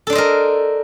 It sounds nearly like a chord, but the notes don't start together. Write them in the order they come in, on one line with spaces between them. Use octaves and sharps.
A4 D4 C5 D#5 A#4